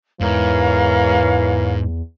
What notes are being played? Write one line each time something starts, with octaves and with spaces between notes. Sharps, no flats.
E2 G#2 E3 A#4 C#5 F5